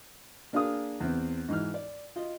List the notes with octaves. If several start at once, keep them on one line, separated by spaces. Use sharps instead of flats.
A#3 D4 G#4 F5 D#6
E2 C4
G#2 E3 F6
D5
F4 D#5